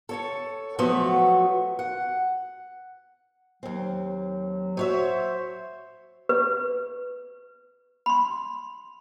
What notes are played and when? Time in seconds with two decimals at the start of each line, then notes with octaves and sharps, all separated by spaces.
0.09 A4 C#5 A5
0.79 F3 F#3 A3 B3 F#4
1.79 F#5
3.63 D#2 F#3 C4
4.77 F#3 C5 C#5 E5
6.29 B4
8.06 B5 C6